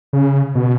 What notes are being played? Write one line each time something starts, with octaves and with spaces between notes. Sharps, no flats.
C#3
B2